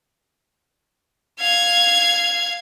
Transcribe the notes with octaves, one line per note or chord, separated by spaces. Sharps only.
F5 G#6